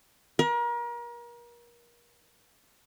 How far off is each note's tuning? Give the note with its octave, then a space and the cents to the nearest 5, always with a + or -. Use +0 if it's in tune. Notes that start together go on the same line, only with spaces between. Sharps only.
A#4 +35